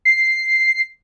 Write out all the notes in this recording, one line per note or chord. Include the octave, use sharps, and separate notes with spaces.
C7